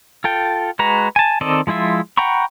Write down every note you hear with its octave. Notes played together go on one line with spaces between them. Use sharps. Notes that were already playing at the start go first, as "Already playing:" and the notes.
F4 A4 G5
G#3 F#4 B4 A#5
G#5 A5
D#3 C4 A4 D5 D#5
F3 G#3 E4 F4 E5
F#5 G5 A#5 B5 C#6